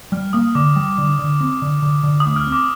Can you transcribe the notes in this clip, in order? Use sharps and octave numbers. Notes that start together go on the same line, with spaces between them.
G3 F6
A#3 D#6
D3 D6
G3
D3
D3
C4
D3
D3
D3
D#6
D2
F6
C4
D6